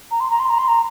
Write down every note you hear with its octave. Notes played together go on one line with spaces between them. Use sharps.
A#5
C6
A#5
C6
A#5
C6
A#5